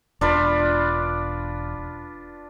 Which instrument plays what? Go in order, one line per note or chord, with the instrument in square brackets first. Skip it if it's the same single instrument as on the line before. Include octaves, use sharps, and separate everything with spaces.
[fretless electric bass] E1 [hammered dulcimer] D4 F4 B4